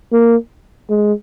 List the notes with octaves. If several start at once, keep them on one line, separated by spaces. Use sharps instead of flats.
A#3
G#3